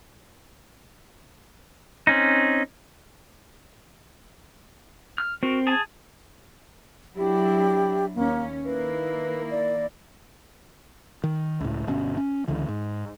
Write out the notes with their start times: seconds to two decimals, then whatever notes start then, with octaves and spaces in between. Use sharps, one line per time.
2.07 C4 C#4 D#4
5.18 F6
5.43 C4 F#4 A#4
5.67 G#4 G#5 A5
7.16 F#3 D4 E4 G4
8.15 D#2 A#3 C#4
8.65 D#3 A#3 E4 B4
9.51 D5
11.24 D#3
11.60 C#2 A2
11.87 G1 B2 C#4
12.17 C#4
12.48 C#2 D3 E3
12.68 G#2